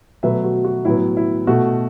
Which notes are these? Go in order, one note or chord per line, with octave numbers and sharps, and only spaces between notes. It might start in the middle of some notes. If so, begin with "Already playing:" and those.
B2 F#3 A3 B4 E5
F#4
F#4
A2 F#3 B3 E4
E4
B2 A3 F#4